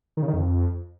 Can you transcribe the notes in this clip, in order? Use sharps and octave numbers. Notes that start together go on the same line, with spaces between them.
D#3
C#3
D#3
F2